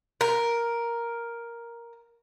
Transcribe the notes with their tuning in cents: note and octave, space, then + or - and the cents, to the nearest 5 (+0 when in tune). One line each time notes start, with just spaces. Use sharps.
A#4 +5